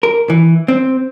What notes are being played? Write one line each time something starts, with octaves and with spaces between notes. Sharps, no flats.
A#4
E3
C4